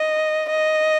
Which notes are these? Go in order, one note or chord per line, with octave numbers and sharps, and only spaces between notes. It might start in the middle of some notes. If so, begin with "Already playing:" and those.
Already playing: D#5
D#5